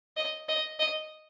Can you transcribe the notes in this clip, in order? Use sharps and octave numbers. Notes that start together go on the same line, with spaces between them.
D#5
D#5
D#5